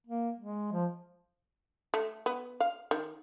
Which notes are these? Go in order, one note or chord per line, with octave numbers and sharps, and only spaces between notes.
A#3
G#3
F3
A3
B3
F5
D#3